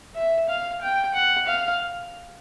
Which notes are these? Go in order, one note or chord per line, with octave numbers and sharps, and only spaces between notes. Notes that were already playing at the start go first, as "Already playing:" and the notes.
E5
F5
G5
F#5
F5